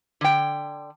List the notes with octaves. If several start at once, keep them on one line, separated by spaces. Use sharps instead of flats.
D3 G5